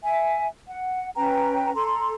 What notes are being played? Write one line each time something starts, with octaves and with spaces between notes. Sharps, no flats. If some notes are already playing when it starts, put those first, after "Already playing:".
E5 G#5
F#5
C#4 B4 G5 A#5
A4 A#5 C6